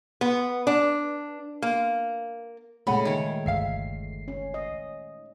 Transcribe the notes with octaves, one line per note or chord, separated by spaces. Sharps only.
B3
D4
A#3
A#2 C#3 G#3 A3 F#5 B5
D#3 C#5
G1 C#2 E5 F5 C7
C#4
D#5